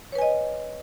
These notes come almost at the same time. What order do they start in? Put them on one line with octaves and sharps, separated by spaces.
C#5 B4 G#5 D#5